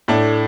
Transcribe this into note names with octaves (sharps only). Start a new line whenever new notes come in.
A2 A3 D4